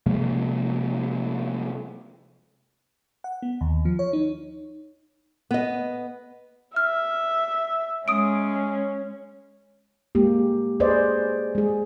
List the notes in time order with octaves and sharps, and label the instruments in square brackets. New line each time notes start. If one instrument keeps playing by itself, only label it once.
[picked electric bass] C3 F3 G#3 A#3
[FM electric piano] F#5
B3
D#2
F3
C#5
D#4
[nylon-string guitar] B3 D#5
[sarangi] E5 [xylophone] F6
[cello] G#3 [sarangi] C#4 [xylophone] D#6 D7
[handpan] G#3 A#3 G4
G#4 B4 C5 D5 D#5
G#3 G#4